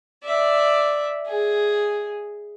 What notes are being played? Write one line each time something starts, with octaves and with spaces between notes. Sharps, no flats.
D5 E5
G#4